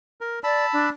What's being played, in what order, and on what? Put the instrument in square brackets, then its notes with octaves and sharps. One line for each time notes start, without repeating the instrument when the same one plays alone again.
[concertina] A#4
[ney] D5 [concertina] A5 B5 E6
[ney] D4